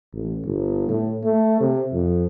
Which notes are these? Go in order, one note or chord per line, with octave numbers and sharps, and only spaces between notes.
A1
G1
A2
A3
C3
F2